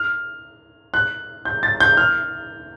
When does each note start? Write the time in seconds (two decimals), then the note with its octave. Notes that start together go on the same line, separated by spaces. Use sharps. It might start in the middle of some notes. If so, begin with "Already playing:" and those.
Already playing: F6
0.94 F#6
1.45 G6
1.63 A6
1.80 G6
1.97 F6